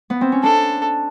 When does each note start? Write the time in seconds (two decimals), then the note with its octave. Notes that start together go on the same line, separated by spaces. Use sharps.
0.10 B3
0.21 C4
0.32 C#4
0.43 D4 A4